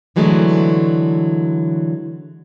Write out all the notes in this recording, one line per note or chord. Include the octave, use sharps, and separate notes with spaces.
D3 E3 F#3 G#3 A3